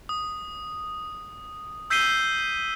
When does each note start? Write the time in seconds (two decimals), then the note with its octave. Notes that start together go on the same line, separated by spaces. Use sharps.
0.09 D#6
1.90 E6 G6 B6 C7 D#7 G7